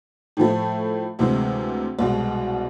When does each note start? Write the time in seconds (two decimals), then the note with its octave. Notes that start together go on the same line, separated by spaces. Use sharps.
0.37 A2 F3 A3
1.19 D2 C3 E3 G#3
1.99 C2 B2 G#3